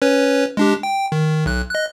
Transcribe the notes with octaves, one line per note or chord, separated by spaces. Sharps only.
C#4 B4 C#5
G#3 D4 G4
G5
D#3
B1 F#6
D#5 F#6